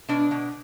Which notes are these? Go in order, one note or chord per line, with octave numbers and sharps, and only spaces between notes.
B2 D4
B2